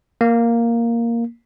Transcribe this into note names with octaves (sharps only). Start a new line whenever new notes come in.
A#3